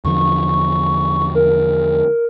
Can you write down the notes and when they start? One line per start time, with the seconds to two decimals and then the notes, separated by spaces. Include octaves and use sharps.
0.05 E2 D3 F3 C#6
1.35 A#4